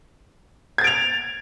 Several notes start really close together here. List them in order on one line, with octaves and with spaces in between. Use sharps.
G#6 A6 D7 F7